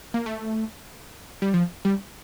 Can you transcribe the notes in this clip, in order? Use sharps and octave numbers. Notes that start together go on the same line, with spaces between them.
A#3
A3
G3
F3
G3